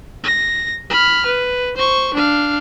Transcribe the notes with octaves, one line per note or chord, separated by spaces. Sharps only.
A#6
B5 F6
B4
C5 C#6
D4 F5